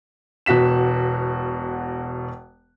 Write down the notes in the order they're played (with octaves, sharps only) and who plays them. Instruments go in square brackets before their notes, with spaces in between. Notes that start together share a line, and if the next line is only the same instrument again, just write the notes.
[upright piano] E1 B2 F#4 B6 E7